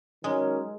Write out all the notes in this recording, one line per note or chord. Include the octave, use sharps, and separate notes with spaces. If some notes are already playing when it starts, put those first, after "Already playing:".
D#3 F#3 G#3 C#4 A#4